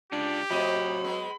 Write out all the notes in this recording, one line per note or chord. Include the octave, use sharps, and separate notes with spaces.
C#2 D4 F4 G4
A2 C3 F#3 D#5 B5
G#3 B3